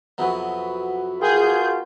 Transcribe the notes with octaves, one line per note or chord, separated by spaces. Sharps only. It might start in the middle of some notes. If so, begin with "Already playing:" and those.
F2 C3 F#3 B3 F#4 B4
F4 F#4 G#4 A#4 G5 G6